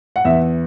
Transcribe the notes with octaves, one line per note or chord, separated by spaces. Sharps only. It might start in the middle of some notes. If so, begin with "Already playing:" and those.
F#5
E2 E5